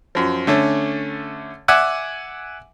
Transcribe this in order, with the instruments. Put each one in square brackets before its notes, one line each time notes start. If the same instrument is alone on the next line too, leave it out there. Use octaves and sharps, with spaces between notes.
[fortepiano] F#2 F3
D3 A3 C#4
D5 E5 F#5 G#5